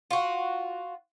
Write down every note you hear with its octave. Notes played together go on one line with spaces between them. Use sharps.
F4 F#4